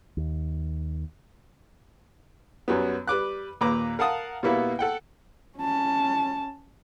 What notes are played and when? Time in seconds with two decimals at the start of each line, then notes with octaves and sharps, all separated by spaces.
0.17 D#2
2.68 F#2 F#3 G3 B3
3.08 G3 B4 D6 F#6
3.61 D#2 A#2 B4 A#5 D6
3.99 A#4 F5 F#5 A5 D#6
4.43 B2 G3 A#3 B3 E4
4.79 A4 F#5 G5
5.58 C#4 A5